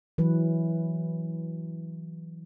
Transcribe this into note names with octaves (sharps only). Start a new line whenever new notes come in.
E3 F#3 B4